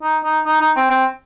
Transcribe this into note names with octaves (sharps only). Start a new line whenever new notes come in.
D#4
D#4
D#4
D#4
C4
C4